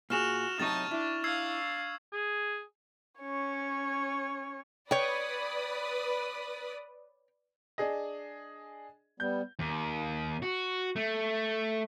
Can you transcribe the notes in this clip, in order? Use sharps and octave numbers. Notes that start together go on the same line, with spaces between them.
A#2 F#4 G#4 F6 E7 F7
A2 C3 F#3 D#4 A5 C#6 A6
D4 E4
D4 F5 E6 G#6 C7
G#4
C#4 C#5
B4 C#5 D5 G5 D#6
D4 G#4 D#5
G3 B3 G6
D#2
F#4
A3